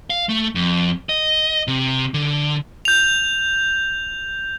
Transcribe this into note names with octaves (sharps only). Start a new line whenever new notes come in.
F5
A3
F2
D#5
C3
D3
G6 F7